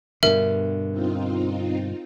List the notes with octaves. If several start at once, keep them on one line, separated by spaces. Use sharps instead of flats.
G2 B2 D3 A#4 E5
C4 D#4 F4